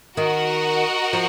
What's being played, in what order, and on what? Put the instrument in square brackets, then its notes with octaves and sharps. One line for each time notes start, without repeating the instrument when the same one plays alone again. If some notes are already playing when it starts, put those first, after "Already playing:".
[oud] D#3 [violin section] F#4 A#4 D#5 F#5
[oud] F3